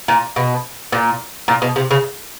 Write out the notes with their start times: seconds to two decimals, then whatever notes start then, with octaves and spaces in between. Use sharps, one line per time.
0.08 A#2
0.36 B2
0.92 A#2
1.48 A#2
1.62 B2
1.76 C3
1.91 C#3